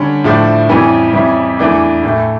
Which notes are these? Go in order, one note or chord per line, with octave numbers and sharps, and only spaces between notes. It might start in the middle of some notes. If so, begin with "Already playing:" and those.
Already playing: D3 G3 C#4
A2 F3 A3 D4
F2 E3 G3 C#4
F2 E3 G3 C#4 E4
E2 E3 A3 D4
A2 E3 A3